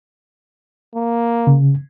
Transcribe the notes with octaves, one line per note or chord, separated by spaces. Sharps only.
A#3
C#3